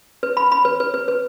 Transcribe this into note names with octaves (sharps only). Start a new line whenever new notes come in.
B4
B5
B5
B4
B4
B4
B4